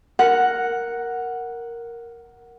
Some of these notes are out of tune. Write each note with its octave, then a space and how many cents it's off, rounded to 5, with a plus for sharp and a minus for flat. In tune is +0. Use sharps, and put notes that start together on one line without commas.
A#4 +0 F#5 +0